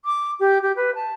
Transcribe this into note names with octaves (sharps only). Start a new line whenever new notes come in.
D6
G4
G4
B4
A5